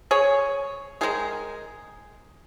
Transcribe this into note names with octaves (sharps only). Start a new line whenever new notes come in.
G#4 C#5
D#3 G#3 D#4 G#4